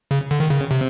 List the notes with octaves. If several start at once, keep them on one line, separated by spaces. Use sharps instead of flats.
C#3
D3
D#3
C#3
C3